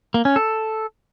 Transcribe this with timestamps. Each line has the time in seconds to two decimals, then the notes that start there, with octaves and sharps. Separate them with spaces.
0.14 A#3
0.25 C#4
0.36 A4